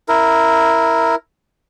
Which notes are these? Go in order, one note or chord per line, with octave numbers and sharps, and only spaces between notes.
E4 A#4